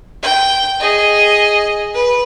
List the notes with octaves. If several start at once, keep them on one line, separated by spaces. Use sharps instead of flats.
G5
G#4 D#5
B4